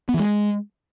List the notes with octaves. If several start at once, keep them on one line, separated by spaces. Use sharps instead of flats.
B3
E3
G#3